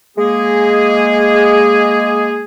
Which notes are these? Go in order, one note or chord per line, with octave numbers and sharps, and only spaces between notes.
G#3 A#3 G#4